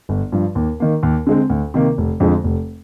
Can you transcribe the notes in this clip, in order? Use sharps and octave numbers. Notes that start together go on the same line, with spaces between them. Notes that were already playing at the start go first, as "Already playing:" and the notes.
G1
G2 F3
D#2
D#3 A#3
D#2
D3 G#3 C4
D2
C3 D#3 A#3
F1
F2 D3 F3 G#3
F1